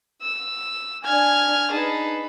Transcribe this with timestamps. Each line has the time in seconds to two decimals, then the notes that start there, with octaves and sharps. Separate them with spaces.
0.22 E6
1.04 D4 G#5 F6 G#6
1.71 D#4 G#4 B4 A5